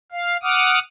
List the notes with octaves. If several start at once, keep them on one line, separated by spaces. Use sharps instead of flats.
F5
F#5 D6 D#6 F6